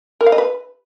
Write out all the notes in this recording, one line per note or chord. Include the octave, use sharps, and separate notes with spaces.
A#4
F5
D#5
B4